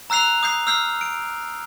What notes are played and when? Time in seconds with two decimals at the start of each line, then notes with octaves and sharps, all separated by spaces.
0.10 A#5 E6 F#6 C7 F7
0.43 D#6 G6 C7
0.67 E6 F6 G6 C7
1.01 D7